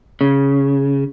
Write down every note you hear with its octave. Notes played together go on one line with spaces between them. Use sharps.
C#3